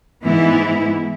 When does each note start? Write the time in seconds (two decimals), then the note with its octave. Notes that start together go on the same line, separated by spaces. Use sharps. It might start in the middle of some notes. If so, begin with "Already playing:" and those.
0.24 G#2 E3 B3 E4